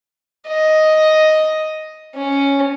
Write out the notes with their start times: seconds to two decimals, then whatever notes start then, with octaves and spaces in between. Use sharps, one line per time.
0.48 D#5
2.16 C#4